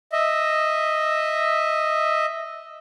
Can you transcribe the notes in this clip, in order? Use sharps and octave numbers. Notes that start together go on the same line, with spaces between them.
D#5 E5